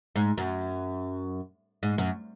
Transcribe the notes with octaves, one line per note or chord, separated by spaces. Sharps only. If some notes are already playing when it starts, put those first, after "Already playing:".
G#2
F#2
G#2
F#2